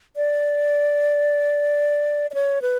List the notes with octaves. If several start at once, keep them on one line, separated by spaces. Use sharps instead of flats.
D5
D5
C#5
B4